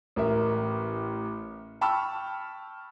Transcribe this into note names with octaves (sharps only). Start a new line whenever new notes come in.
A1 A#4 E5
G5 A5 B5 C#6 E6 F6